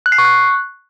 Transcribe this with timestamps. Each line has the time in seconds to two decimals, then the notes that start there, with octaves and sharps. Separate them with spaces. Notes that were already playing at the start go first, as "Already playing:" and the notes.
0.06 F#6
0.12 C7
0.18 C#6
0.25 F#6